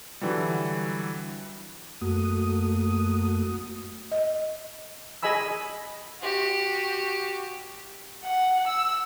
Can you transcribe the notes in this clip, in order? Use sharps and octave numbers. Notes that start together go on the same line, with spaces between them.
D3 E3 F#3 G3
F#2 A3 A#3 F#4 D#6
D#5
G#4 D#5 G#5 B5 E6
F#4 G4
F#5
E6